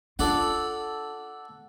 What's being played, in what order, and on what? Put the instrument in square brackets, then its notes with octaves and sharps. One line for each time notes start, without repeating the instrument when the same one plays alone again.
[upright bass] D4 F4 [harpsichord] A4 D5 F#5